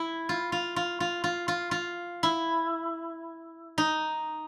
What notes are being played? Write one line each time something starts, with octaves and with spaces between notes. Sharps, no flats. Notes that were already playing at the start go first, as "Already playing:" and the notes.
Already playing: E4
F4
F4
F4
F4
F4
F4
F4
E4
D#4